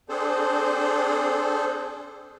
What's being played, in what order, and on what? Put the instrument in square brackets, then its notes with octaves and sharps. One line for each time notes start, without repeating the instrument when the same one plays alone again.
[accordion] C4 D4 G#4 A4 C5